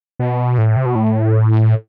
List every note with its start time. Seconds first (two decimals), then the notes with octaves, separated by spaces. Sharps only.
0.19 B2
0.58 A2
0.76 C3
0.86 B2
0.95 A2